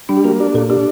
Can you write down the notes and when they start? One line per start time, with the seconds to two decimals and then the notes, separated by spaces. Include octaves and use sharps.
0.09 G3 D4
0.17 G4
0.24 A#3 F#4
0.40 D4 G4
0.54 A#2 A4
0.70 D4 G4